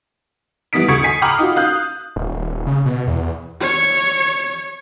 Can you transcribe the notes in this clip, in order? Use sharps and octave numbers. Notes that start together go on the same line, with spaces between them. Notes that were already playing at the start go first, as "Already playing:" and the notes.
E3 G3 B3 D#6 B6 D7
D2 C#6 G#6 C#7
G#5 B6 C7
G5 A#5 B5 D6 D#6 F6
D#4 F4 F#4
F5 D#6 F#6 G6
D#1
D#1
C#3
B2
E2
C#5